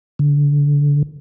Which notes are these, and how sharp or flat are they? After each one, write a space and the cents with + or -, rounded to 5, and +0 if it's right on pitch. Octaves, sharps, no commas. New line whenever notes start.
D3 -25